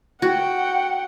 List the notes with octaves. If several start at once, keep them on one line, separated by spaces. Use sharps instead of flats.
F#4 F#5 G5